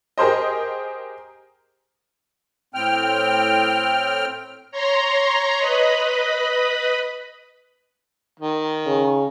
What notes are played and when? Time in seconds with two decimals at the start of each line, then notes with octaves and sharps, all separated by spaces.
0.18 G4 G#4 A#4 C5 D#5
2.74 A2 C4 G5 F6
4.72 C#5 A#5 C6
5.58 B4 D#5 B5
8.39 D#3
8.86 C#3